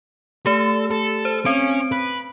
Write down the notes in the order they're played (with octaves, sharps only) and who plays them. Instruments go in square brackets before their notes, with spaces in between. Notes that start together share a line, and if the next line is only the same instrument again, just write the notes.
[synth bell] A3 G4 [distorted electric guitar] A4
[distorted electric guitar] A4
[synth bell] C5
[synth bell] C4 D7 [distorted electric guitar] C#4
[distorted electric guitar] B4